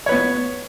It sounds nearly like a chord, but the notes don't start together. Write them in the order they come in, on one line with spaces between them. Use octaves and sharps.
C#5 B4 B3